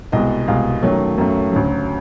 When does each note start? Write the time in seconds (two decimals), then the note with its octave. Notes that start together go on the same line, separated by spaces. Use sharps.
0.12 C2 B2 G#3 D#5
0.48 C2 B2 G#3 F5
0.82 F#2 D#3 F#3 A3
1.18 F#2 D#3 F#3 A3
1.51 D2 C#3 F#3